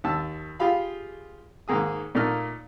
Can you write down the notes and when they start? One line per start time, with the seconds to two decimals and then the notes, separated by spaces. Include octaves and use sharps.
0.04 D#2 A5 E6
0.59 F4 G4 G#4 F5 B5
1.68 G#2 D#3 A#3 G#4 D#6
2.15 A#2 A3 A#3 D#4 F6